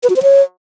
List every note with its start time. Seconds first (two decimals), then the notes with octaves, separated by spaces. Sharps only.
0.03 B4
0.10 F#4
0.16 C5
0.23 C#5